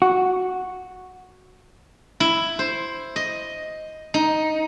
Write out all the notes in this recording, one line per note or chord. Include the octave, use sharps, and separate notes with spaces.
F#4
E4
C5
D#5
D#4